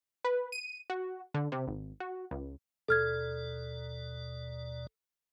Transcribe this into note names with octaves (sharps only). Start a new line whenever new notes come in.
B4
D#7
F#4
D3
C3
G#1
F#4
C#2
D#2 B2 A4 D5 F6 G#6